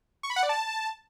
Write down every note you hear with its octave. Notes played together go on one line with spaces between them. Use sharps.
C#6
B5
F#5
D5
A5